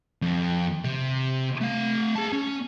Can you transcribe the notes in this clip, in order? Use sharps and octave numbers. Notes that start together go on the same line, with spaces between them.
F2
C3
A3 F5
G#4 A5
C#4